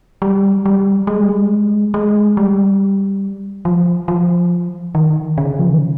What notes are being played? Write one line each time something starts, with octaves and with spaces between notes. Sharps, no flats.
G3
G3
G#3
G3
G#3
G#3
G3
F3
F3
D#3
C#3
F3
D#3
C#3